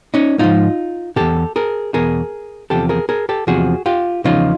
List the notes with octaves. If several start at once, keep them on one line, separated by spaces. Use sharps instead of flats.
C#4 D#4
G#2 F3 D#4 F4
E2 B2 G4 A4
G#4 A#4
E2 B2 G#4 A#4
E2 C3 F3 G4 A4
G#4 A#4
G#4 A#4
G4 A4
E2 C3 F3 F#4 G#4
F4 G4
E2 C#3 F3 D#4 F4